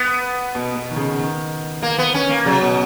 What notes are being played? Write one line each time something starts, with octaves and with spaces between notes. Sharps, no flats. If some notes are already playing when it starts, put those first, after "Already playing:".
Already playing: B3
B2
B2
D#3
C#3
D#3
A#3
B3
C#4
A#3
C#3 F#3
B2